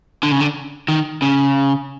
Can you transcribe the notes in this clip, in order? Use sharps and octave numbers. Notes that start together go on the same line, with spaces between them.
D3
C#3
D3
D#3
C#3